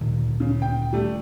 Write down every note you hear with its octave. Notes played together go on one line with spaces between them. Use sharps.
D2 A#2 D#3
C#3
G5
G3 A3